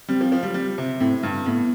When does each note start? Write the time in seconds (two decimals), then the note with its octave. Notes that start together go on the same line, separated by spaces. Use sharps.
0.09 G3 C4
0.21 F3
0.32 F3
0.43 G3
0.54 G3
0.78 C3
1.00 A2 C4
1.23 G2
1.46 A2 B3